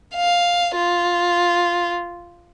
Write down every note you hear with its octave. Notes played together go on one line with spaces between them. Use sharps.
F5
F4